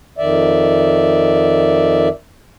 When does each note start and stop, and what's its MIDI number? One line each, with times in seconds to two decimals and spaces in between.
0.18 2.09 41
0.18 2.09 51
0.18 2.09 74
0.18 2.09 76